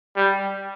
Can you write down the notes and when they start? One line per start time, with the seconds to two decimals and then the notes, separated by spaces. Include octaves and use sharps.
0.16 G3